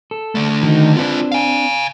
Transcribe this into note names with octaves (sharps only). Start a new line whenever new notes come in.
A4
D3 A3
D#3 D#4
C4 D4 F4 B4
F5 G#5